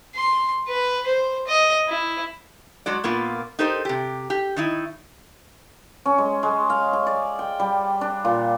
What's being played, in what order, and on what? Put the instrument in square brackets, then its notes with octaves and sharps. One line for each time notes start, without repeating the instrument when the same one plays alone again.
[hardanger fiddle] C6
B4
C5
D#5
E4
[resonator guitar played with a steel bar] F#3 G#3 F#4 D5
A#2 A#3 B3 F4
D#4 G4 A4 A#4 C5 D#5
C3 G4
G4
D#3 D#4 E4
[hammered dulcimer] C#4
G#3
G#3
F5
G#5
D5
G5
G3
D4
A#2